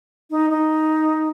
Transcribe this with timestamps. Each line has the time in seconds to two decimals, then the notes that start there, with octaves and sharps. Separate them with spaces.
0.30 D#4
0.50 D#4